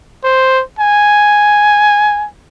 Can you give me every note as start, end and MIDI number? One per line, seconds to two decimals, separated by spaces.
0.24 0.62 72
0.79 2.27 80